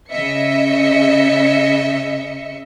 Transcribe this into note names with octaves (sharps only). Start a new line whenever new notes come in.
C#3 D#5 E5 C#7